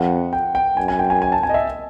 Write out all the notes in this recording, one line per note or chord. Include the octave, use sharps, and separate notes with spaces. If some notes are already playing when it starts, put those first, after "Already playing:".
Already playing: F2 F#5
G5
G5
F#2 G#5
G#5
G5
G#5
G#5
A5
G#5
D#5
E5